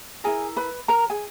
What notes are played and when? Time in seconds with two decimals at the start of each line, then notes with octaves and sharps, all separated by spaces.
0.24 E4 G#4 A#4 G#5
0.56 B4 B5
0.88 A#4 A#5
1.10 G#4 G#5